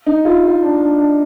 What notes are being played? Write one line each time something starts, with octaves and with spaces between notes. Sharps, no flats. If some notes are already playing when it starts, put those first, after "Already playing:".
D#4
F4
F4
D4
D4
D4